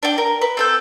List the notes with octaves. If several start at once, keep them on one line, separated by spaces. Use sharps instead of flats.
D4 G5
A#4
B4
C4 A4 G6